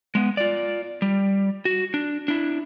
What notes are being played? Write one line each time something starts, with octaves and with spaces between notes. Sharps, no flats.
G#3 B3
F4 D5
G3
F#4
D4
D4 E4